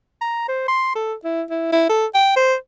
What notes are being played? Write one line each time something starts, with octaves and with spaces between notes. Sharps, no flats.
A#5
C5
C6
A4
E4
E4
E4
A4
G5
C5